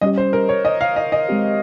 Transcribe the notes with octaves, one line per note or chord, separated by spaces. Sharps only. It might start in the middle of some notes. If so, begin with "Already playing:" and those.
G3 C#4 G4 D#5
C5
A#4
C#5
D#5
F5
D#5
D#5
G#3 C4 G4